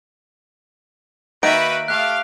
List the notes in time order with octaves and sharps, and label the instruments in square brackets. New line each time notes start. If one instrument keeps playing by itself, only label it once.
[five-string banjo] D#3 A#3 [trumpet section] F#4 B4 [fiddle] E5 [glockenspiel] D7
[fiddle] A3 [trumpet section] G4 F5 [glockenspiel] F#6